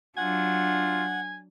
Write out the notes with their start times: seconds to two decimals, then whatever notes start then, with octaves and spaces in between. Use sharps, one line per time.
0.17 F#3 D4 F4 F#5 G#5